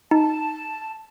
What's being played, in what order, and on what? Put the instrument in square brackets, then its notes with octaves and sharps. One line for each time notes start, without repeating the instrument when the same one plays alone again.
[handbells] D#4 [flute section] A5